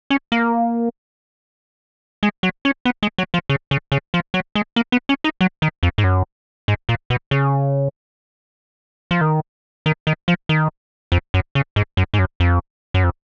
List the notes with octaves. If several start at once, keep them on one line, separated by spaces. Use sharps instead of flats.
C#4
A#3
G#3
F#3
C#4
B3
G#3
F#3
F3
C#3
C#3
C#3
F3
F#3
G#3
A#3
B3
C#4
D#4
F#3
D#3
F2
G#2
F#2
G#2
A#2
B2
C#3
F3
D#3
D#3
D#3
F3
D#3
F2
F#2
C#3
G#2
F#2
G#2
F#2
F2
F#2
F2